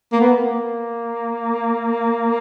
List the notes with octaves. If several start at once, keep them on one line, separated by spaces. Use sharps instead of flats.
A#3
B3
A#3